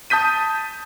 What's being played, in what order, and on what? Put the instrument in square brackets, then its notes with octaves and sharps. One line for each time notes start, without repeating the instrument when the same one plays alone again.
[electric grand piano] A5 D#6 G6 B6 D#7